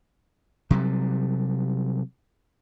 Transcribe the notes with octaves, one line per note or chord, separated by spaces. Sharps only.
C3 F#3 G3